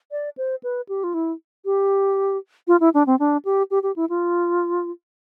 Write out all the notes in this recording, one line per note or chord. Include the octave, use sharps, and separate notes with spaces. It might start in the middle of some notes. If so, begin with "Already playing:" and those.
D5
C5
B4
G4
F4
E4
G4
F4
E4
D4
C4
D4
G4
G4
G4
E4
F4